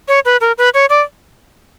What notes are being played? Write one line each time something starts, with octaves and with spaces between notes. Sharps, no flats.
C#5
B4
A#4
B4
C#5
D5